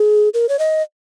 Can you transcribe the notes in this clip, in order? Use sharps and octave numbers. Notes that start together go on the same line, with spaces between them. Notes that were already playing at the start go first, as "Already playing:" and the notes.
Already playing: G#4
A#4
C#5
D#5